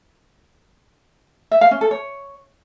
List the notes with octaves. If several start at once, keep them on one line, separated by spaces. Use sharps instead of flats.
E5
F5
C#4
A4
C#5